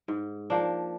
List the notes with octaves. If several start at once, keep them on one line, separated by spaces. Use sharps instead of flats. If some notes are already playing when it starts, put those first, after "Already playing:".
G#2
F3 A#3 D4